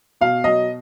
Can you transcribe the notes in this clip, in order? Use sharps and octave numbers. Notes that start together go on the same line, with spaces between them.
B2 F5
F#3 D#5